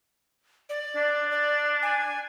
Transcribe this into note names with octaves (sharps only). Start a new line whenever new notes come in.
D5
D4
D5
G#5